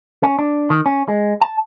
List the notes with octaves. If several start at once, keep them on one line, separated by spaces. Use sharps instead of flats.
C#4
D4
D#3
C#4
G#3
A5